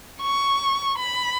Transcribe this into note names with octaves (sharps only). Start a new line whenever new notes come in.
C#6
B5